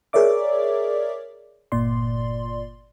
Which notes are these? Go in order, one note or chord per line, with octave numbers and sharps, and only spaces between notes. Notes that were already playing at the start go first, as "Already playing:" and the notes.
G#4 A#4 C#5 D5 E5 D6
G1 A#2 D5 C6